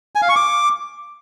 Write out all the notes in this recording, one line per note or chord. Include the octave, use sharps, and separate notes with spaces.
G#5
F5
C#6
D6